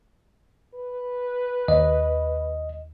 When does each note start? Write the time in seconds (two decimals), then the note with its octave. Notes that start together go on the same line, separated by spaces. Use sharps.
0.75 B4
1.68 D#2 D#5